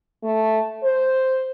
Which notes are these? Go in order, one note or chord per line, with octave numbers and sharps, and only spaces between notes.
A3
C5